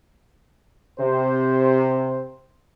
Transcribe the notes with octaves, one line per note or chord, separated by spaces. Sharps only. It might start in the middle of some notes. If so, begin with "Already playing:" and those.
C3 C5